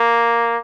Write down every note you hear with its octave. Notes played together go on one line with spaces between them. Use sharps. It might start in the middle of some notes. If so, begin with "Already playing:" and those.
Already playing: A#3